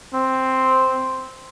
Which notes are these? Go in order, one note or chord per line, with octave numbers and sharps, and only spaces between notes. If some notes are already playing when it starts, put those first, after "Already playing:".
C4